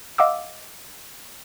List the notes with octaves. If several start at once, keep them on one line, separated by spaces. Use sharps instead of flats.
D#5 F5 F#5 D6 E6